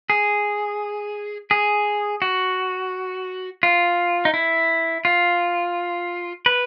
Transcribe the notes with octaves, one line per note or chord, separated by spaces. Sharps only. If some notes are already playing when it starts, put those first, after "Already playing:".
G#4
G#4
F#4
F4
D#4
E4
F4
B4